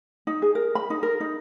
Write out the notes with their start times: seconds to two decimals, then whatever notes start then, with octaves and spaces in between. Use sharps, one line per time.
0.27 D#4
0.42 G#4
0.55 A#4
0.75 B5
0.90 D#4
1.03 A#4
1.20 D#4